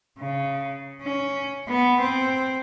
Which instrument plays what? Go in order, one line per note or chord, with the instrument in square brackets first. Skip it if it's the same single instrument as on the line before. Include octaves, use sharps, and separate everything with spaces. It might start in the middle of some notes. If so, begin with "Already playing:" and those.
[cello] C#3
C#4
B3
C4